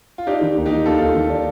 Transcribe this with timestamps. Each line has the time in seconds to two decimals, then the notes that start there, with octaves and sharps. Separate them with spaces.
0.18 F4
0.27 D4 D#4 G4
0.41 D#3
0.57 D#2
0.66 D#4 G4
0.72 D#3
0.86 D#2 F4 A4
1.00 D#2
1.15 D#3
1.30 D4